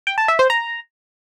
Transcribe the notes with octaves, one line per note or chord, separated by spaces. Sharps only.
G5
A5
E5
C5
A#5